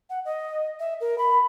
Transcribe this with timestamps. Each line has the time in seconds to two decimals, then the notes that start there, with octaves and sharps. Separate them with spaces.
0.10 F#5
0.25 D#5
0.79 E5
1.00 A#4
1.18 B5